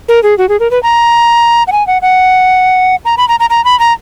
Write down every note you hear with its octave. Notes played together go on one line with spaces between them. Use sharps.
A#4
G#4
F#4
G#4
A#4
B4
A#5
F#5
G#5
F#5
F#5
A#5
B5
A#5
A#5
A#5
B5
A#5